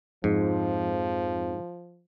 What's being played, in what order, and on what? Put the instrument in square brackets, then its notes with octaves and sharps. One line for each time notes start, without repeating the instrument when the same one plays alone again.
[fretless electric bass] F2 [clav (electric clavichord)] G#2 [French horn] F3